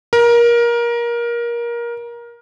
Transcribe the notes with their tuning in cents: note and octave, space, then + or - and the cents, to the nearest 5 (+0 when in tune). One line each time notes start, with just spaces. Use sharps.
A#4 +20